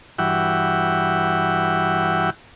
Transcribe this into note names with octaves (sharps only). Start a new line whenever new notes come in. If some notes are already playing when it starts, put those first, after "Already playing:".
G2 E3 F#4 E5 F#5 G5